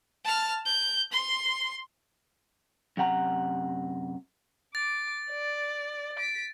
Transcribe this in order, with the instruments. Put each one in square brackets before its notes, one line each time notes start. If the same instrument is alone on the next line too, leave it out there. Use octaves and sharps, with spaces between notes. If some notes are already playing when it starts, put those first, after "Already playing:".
[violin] A5 F6
G6
C6
[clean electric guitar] F#2 C3 F#5 A#5
[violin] D6 [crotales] A6
[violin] D5
B6 D7